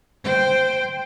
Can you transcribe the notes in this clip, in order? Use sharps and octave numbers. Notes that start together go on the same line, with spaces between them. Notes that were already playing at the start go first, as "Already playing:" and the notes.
C5 G5